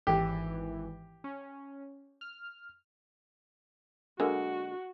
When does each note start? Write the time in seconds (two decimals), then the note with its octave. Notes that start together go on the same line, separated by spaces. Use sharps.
0.07 G#1 E3 G4
1.24 C#4
2.21 F6
4.20 D3 G#3 A#3 F#4